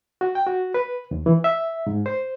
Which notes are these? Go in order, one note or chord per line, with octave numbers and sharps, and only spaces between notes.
F#4
G5
F#4
B4
D#2
E3
E5
G#2
C5